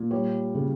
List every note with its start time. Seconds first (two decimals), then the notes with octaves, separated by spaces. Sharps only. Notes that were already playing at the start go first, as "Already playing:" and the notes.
Already playing: A#2
0.11 G3 C#5
0.55 C#3